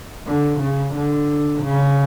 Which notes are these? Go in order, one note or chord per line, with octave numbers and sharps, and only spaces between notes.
D3
C#3
D3
C#3